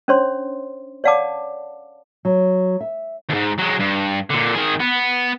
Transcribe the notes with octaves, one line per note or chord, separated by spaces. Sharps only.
C#4 D4 C5 C#5 C6
C#5 D5 F5 F#5 A5 D6
F#3
E5
D#2 G#2
F#3 G#3
G2
A#2 D3
D#3 G#4
B3